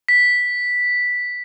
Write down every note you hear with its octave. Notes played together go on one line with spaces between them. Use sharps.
B6